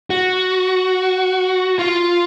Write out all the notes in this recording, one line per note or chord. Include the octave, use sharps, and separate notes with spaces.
F#4
F4